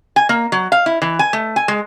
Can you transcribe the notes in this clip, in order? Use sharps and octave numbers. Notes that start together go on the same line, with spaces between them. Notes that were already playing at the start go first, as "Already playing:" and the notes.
G#5
A#3
F#3
F5
E4
E3
G#5
A3
G#5
G#3